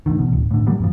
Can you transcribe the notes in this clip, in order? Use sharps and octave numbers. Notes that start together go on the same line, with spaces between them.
A1 A#2 D3 D#3
A1 B2
D1
A2 D3
D#3 F#3 G3 A#3
F2 G#2 F3